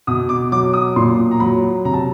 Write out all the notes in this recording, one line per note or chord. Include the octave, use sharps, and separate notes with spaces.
B2 D#6
D6
F#3 D6
D#6
A#2 C6
A#5
F#3 B5
C3 A#5
A5